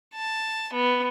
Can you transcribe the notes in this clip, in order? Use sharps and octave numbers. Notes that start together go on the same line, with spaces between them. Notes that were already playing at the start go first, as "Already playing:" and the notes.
A5
B3